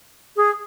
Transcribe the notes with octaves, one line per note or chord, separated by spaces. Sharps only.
G#4